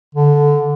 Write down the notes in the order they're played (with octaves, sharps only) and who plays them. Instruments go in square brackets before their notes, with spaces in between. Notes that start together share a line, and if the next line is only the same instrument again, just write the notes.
[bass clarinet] D3